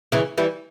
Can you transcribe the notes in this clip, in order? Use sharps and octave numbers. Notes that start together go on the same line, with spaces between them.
C#3 E3
E3 G3